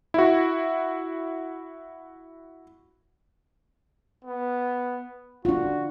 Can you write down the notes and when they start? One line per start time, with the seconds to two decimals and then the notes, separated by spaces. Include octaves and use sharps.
0.14 E4 F#4
4.25 B3
5.45 D4 F4 F#4